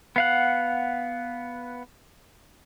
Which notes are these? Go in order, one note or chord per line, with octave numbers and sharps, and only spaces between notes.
B3 F5 F#5